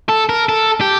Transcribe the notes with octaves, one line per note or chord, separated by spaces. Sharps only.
A4
A#4
A4
G4